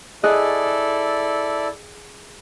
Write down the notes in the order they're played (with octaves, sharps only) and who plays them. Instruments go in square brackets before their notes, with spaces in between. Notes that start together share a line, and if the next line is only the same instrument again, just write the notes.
[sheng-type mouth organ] E4 A4 D5 [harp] G#4 D#5 F#6